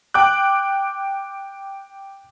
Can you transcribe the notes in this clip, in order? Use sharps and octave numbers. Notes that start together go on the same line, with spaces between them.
G5 D6 F#6